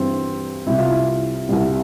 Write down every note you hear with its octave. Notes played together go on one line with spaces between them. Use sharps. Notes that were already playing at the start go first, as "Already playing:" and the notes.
Already playing: G2 E3 G3 C4
C2 C3 G3 E4
F4
E4
C2 C3 G3